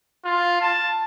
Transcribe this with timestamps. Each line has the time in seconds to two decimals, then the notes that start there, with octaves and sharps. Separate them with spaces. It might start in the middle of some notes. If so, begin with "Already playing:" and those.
0.25 F4
0.61 A5